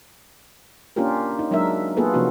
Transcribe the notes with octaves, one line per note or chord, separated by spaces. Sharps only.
A#3 C#4 D4 F4 G4 A#4
D#4
F#3 G#3 D4 D#4 A#4 E5
A#3 B3 F4 G#4 A4 B4
C3 F3 A#3 C#4 D#4 F#4